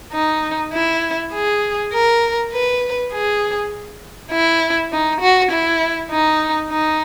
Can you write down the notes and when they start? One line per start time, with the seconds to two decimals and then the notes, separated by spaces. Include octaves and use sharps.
0.13 D#4
0.73 E4
1.33 G#4
1.93 A#4
2.53 B4
3.12 G#4
4.31 E4
4.92 D#4
5.21 F#4
5.51 E4
6.11 D#4
6.71 D#4